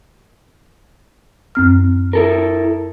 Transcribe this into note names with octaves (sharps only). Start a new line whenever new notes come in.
F#2 C4 F6
E4 A4 A#4